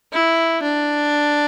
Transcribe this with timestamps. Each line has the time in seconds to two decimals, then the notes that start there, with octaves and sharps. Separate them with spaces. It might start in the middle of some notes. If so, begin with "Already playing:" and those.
0.13 E4
0.62 D4